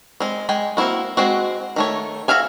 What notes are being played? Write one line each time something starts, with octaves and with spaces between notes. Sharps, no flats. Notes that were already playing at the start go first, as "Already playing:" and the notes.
G#3 C4
G#3 G5 G#5
A#3 C4 D4 E4 F#4
G#3 C4 F#4
D#3 A3 C#5
F#4 G#4 E5 F5 G#5